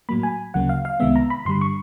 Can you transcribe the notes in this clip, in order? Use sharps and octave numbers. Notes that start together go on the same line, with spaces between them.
A2 F#3 A#3 B5
G#5
D2 C#3 F#3 A#3 F#5
F5
F5
C2 C3 D#3 G#3 B3 E5
A#5
B5
G2 D3 G3 C6
C#6